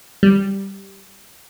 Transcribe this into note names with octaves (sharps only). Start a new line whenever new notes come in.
G3